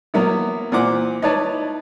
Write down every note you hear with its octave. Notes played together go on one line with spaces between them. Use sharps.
F#3 A#3 B3 E4
A#2 E3 C5 F#5 D6
D#4 E4 B4 C#5 D5 A5